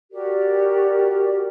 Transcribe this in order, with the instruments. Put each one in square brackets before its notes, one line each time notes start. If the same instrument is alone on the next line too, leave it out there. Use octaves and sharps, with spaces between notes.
[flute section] F#4 G4 A#4 D5